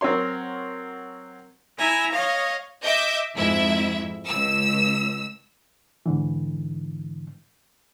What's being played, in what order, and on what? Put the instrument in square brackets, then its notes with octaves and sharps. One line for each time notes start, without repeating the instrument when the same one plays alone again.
[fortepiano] F#3 C4 A#4 C#5 C6
[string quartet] E4 E5 G#5 A#5
C#5 D#5 F5
[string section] D#5 E5 D6 G6
F2 G#2 E4 E5
C#2 E6
[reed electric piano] G#2 D3 E3